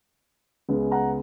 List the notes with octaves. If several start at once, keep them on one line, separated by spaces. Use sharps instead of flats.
C#2 C#3 G#3 B3
F#5 A#5